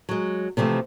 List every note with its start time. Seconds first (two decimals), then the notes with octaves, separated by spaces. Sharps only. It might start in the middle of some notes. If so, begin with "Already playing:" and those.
0.09 F#3 G#3
0.57 C3 E3 F3 A3